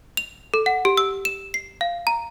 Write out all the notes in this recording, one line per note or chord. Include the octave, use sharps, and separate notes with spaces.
F7
A4
F#5
G4
E6
E7
C7
F5
A#5